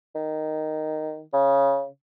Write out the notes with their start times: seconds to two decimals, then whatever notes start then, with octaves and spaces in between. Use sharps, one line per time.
0.15 D#3
1.33 C#3